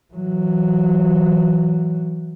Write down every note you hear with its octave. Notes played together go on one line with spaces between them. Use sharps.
E3 F#3